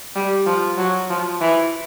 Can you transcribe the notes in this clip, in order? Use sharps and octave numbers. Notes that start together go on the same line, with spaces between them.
G3
F3
F#3
F3
E3